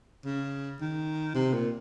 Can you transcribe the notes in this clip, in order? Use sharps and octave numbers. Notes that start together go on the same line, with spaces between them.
C#3
D#3
C3
A#2